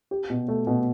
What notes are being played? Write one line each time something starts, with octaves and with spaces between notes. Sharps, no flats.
G4
B2
A3
B2